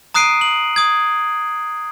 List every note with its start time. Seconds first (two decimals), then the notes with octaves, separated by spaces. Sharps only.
0.14 A#5 D#6 F#6 C7 D7 D#7
0.41 F#7
0.76 D#6 G#6